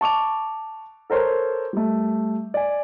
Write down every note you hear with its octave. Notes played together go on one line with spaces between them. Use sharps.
A5 C#6 D6 F7
A4 A#4 C5 C#5
G3 A3
D5 G#5